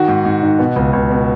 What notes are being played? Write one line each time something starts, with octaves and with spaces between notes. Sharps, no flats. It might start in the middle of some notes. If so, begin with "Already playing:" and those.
Already playing: D#3 F#4
G#2
G#2
D#3
B2
C#2
C#2
B2